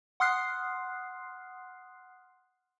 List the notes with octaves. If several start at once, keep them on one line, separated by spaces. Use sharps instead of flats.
F#5 C6 D#6 F6 F#6 C7